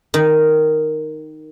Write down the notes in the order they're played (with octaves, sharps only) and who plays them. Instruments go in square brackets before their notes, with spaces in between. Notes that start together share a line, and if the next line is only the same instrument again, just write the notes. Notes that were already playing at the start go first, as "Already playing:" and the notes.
[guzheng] D#3